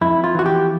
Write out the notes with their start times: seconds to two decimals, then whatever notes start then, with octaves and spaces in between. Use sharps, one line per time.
0.01 F2 E4
0.24 F4
0.35 E3 F#4
0.46 G4